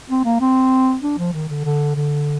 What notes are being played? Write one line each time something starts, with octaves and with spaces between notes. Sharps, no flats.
C4
A#3
C4
D4
F3
D#3
D3
D3
D3